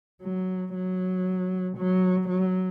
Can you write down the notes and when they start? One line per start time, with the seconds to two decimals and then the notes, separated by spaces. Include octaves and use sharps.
0.23 F#3
0.74 F#3
1.77 F#3
2.29 F#3